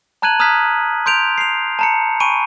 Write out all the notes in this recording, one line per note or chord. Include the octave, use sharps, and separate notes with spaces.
A5 A#5 F#6 G#6 D#7 F#7
A#5 D#6 F6 F#6 G#6 B6
C6 G6 D7 F7
C7 F7
A5 A#5 C#7
G#5 B5 C#6 D7 D#7